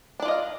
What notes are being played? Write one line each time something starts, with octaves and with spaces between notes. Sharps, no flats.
D4 F4 D5 D#5 F5